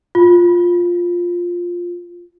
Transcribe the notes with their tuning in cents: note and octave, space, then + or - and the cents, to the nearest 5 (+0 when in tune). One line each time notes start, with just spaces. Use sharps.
F4 +5